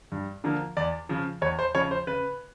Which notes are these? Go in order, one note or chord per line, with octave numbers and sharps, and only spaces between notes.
G2
D3 F3 A#3
E2 D5
C#3 F3
E2 C#5
C5
C#3 F3 C#5
C5
C#3 B4